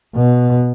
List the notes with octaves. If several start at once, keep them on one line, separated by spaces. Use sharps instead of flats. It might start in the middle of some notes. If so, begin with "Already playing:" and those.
B2